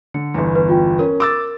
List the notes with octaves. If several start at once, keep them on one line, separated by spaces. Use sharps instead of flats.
D3 C#7
G1 E2
B4
F4 G5
C#4 A#4
D6 E6 A6